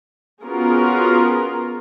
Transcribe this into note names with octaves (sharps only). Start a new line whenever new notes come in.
B3 C#4 F4 F#4 G#4 A#4